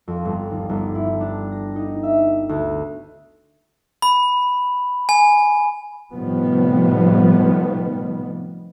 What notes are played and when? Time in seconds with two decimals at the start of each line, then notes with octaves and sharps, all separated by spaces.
0.08 F2
0.25 G1
0.50 D#2
0.69 G1
0.95 E4
1.21 D4
1.52 A#6
1.76 D#4
2.03 E5
2.49 D2
4.02 B5
5.09 G#5
6.13 A2 C3 D#3 F3 G3 B3